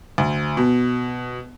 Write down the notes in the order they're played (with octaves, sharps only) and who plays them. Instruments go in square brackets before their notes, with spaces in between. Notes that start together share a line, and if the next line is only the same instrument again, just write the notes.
[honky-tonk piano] D2
B2